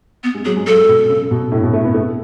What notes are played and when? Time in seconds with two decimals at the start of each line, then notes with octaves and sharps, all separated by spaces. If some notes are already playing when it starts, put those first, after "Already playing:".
0.24 B3
0.35 G#3
0.45 F#3 G#4
0.56 G#3
0.66 F#3 A4
0.88 B2
1.09 C#3
1.31 B2
1.52 A2
1.63 B2
1.73 A3
1.84 B3
1.94 A3